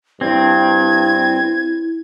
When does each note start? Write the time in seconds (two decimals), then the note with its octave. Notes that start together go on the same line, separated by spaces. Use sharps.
0.21 G2 C4 E4 G#6